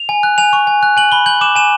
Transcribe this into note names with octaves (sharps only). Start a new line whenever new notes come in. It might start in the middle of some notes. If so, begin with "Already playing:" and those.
Already playing: F7
G#5
F#6
G#5 F7
C#6
G#5
F#6
G#5 F#7
B5 G7
G6 F#7
D6 E7
G#5 E7